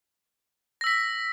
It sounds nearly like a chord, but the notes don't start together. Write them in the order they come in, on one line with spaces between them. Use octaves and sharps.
A#6 E6 B6